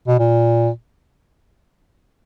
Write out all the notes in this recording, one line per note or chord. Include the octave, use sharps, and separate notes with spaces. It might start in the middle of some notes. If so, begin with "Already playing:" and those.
B2
A#2